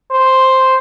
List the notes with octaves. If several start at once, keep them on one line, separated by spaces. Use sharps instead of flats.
C5